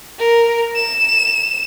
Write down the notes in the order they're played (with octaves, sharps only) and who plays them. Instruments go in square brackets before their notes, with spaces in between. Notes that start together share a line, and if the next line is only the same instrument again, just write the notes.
[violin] A#4
E7